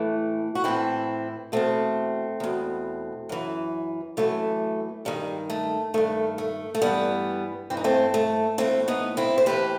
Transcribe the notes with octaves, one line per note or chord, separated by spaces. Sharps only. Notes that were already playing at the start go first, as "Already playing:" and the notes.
Already playing: A2 E3 A3
F#4
A2 E3 C4 E4
E2 B2 A3 C4
E2 B2
F#2 E3
F#2 E3 A3
G2 D#3 G3
A3
G2 D#3 A3
A3
A3
G2 E3 G3 B3
G2 E3 C4
D#4
A3 C4
A3
A2 E3 A3 C4
B3 D#4
C4 E4
C5
A2 E3 G4 B4